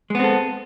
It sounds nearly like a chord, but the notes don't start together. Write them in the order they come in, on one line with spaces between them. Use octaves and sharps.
G#3 B3 C4 A4